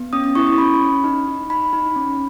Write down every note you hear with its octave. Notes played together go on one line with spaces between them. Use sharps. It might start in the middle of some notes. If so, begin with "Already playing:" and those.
Already playing: B3
C#4 D#6
D#6
E4 C#6
C#6
C#4 B5
C#4
D#4
D#4
D#4 B5
D#4
C#4